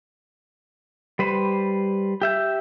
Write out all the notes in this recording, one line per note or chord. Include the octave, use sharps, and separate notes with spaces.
G3 B4 C5
G4 E5 G6